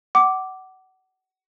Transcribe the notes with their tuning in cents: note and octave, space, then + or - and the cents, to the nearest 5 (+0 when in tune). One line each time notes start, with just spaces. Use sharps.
F#5 +25 D6 +0